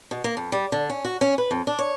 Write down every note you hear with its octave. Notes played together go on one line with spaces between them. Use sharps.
B2
A#3
F2
G3
D3
C#4
F#4
C#4
B4
F2
D4
C#5